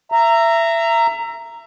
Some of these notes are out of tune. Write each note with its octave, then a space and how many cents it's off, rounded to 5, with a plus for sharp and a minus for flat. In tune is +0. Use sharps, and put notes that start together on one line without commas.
E5 +20 A#5 -10